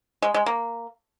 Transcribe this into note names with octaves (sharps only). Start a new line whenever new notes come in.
G#3
G#3
A#3